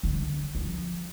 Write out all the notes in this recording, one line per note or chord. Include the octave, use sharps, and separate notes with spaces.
D3
F3